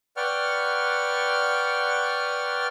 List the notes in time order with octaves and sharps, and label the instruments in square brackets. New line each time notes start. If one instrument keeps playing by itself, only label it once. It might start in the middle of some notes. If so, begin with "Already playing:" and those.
[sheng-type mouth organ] B4 D5 F#5 G5 C#6 F6